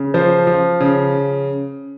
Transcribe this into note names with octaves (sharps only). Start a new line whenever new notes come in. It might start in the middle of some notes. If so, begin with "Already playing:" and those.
Already playing: C#3
F3 C5
F3
C#3